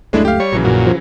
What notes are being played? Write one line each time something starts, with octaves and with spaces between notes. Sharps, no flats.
F#1 C#2 G#3 A3 D4 E4
G4 F5
G3 C#5
A#1 C#3 E3 F#3
F#2 A#2
F3